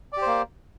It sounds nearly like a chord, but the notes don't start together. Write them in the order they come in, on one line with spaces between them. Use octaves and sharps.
D5 G4 C5 A#3